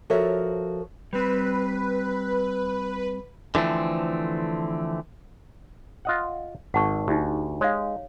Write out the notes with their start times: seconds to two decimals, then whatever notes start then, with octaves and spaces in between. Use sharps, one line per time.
0.10 F3 F#4 A4 A#4 C#5 E5
1.13 G3 C4 B4
3.55 D3 E3 F3 A3 C4
6.05 F4 D#5 F#5
6.74 G#1 F#5 A5 C#6
7.08 D2 D#4 G4
7.61 G#3 C#5 F5